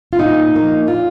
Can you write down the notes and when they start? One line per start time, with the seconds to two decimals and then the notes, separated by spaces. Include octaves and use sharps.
0.13 F4
0.19 A#2 D#4
0.54 F3 A#3
0.87 A#2 F4